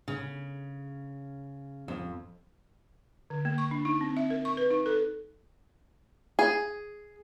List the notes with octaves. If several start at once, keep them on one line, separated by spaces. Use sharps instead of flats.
C#3
F2
D3
A#3
C#6
D4
D#4
C4
E5
A#4
C#6
B4
D#4
A4
G#4